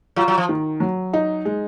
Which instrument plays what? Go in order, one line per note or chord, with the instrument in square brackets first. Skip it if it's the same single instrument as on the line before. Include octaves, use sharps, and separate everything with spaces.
[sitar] F#3 [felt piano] F4
[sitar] F#3
F3
[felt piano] D#3
F#3
D#4
G#3